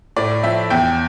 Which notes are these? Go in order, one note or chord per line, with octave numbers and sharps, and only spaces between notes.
A2 D5
F3 E5
E2 G5